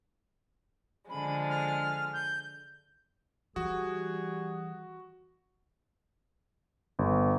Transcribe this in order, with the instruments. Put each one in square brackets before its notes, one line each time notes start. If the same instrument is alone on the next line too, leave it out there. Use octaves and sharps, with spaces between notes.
[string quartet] D3 F3 G#3 [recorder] B5
[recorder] F6
G6
[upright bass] E3 [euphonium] G3 [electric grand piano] F#4 [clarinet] G#4
[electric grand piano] G1